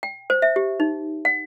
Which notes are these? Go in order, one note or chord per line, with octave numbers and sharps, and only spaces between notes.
G5
C5
E5
G4
D#4
F#5